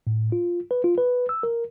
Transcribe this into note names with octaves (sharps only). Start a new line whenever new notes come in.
A2
F4
B4
F4
B4
E6
A#4